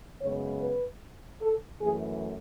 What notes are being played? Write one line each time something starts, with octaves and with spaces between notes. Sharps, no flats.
F#2 C#3 G#3 B3 C#5
B4
A4
F#2 E3 A3 G#4